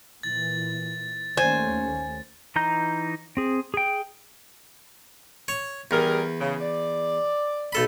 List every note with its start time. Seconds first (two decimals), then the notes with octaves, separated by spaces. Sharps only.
0.23 A#2 E3 A6
1.37 D#2 A3 C#4 C5 G#5
2.56 E3 D#4 A#5 G6
3.37 C4 G#4
3.74 G#4 G5
5.48 C#5
5.91 E2 G3 G#4 A#4
6.40 C#3
6.60 D5
7.73 B1 A4 B5